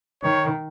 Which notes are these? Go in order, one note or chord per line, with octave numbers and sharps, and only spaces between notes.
D#3 C#5